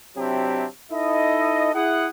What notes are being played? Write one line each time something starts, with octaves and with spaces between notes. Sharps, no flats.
C3 F#3 C4 D4 E4 G4
D#4 E4 A4 D#5
E4 G#4 F#5